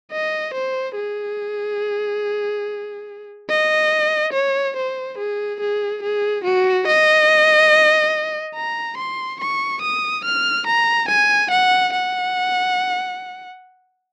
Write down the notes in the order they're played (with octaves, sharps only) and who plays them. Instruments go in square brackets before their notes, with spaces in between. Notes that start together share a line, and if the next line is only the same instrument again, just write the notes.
[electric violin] D#5
C5
G#4
D#5
C#5
C5
G#4
G#4
G#4
F#4
D#5
A#5
C6
C#6
D#6
F6
A#5
G#5
F#5
F#5